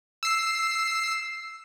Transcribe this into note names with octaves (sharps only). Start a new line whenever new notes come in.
E6 C7